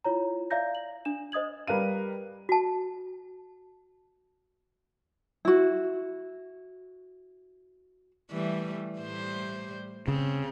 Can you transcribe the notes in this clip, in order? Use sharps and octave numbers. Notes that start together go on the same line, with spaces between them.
E4 F4 C#5 A#5
D5 E5 F5 A#5 G6 A#6
F#7
D4 E7
C5 D#5 D#6 G#6 F#7
G3 A#4 B4 F5 D#7
F#4 A5
E4 F#4
E3 G3 A3
A2 G3 C5
C#3 C4